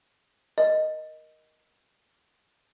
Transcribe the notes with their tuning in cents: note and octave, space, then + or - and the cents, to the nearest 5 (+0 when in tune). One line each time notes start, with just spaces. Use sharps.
A#4 +15 D#5 +0